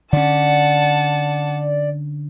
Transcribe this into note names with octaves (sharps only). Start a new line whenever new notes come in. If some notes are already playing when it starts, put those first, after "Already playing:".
D3 C#4 D5 F#5 A5